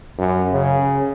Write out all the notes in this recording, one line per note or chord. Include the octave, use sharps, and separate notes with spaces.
F#2
C#3